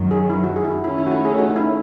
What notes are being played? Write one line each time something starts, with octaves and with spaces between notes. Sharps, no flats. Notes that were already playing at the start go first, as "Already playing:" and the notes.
Already playing: F#2 D#3 F#3
G#4
E4
F#4
G#4
E4
F#4
D#3 A3 C#4 E4
E4
F#4
E4
G#4
F#4
D#4
E4